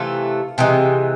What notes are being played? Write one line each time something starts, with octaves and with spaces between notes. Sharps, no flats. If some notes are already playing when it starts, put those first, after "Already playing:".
Already playing: C3 E3 A3 F4
C3 E3 G#3